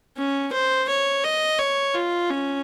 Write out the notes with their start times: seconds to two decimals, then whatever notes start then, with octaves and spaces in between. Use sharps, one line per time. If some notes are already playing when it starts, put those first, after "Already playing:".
0.18 C#4
0.53 C5
0.89 C#5
1.24 D#5
1.59 C#5
1.94 F4
2.30 C#4